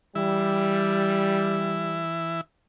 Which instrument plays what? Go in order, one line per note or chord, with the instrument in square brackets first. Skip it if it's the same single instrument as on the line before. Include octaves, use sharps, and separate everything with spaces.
[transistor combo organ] E3 E4 E5 [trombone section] G3